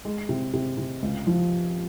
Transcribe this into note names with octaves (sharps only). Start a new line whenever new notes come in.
G#3
C3
C3
C3
C#2
F3